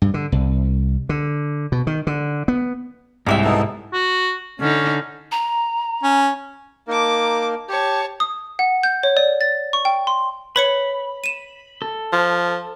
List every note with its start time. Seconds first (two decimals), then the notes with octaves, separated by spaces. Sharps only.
0.02 G2
0.14 D3
0.32 C2
1.09 D3
1.72 B2
1.87 D#3
2.07 D3
2.48 B3
3.26 C2 G#2 C#4 E4 G4 E5
3.44 B3 D#4 A4
3.93 F#4
4.60 D3 C#4 D#4
5.32 A#5
6.03 C#4
6.88 A#3 D#4 A#4 A5 D6
7.69 G4 C#5 A5
8.20 D#6
8.59 F#5
8.83 G6
9.03 C#5
9.17 D5
9.41 A6
9.73 C#6
9.85 G5
10.07 C6
10.56 B4 C#5 B5 C#7
11.24 D#7 E7
11.82 A4
12.13 F3